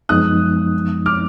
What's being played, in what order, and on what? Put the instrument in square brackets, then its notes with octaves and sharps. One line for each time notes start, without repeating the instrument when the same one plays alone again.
[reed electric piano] F#2 F3 G#3 B3 D#4 [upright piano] D#6 F#6
[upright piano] D6 F6